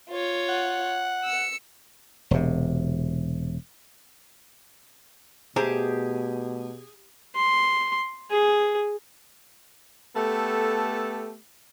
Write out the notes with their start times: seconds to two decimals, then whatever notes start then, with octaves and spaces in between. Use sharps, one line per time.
0.11 F4 C#5
0.49 F#5
1.24 E6 C#7
2.31 E1 C3
5.56 B2 A3 G4 G#4 C5 A#5
7.35 C6
8.31 G#4
10.16 A3 B3 G4 A4